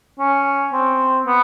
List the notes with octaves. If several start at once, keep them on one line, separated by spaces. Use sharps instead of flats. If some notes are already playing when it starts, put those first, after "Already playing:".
C#4
C4
B3